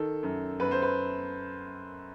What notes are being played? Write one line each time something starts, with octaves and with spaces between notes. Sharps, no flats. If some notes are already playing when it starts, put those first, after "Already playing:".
Already playing: D#3 A4
F#2
F#2 B4
C5
B4